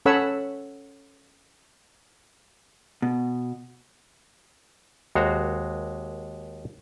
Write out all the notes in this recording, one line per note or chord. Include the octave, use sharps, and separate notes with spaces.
C#4 A4 C#5 F#5 B5 E6
B2
D#2 G#3 F#4 C5 A#5